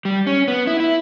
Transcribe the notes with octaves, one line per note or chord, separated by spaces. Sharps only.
G3
C#4
B3
E4
E4